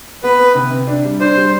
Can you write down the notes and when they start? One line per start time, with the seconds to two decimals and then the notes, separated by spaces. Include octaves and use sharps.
0.23 B3 B4
0.39 B3
0.55 C3
0.71 C3
0.87 D4
1.05 G3
1.20 D4 C5
1.37 G3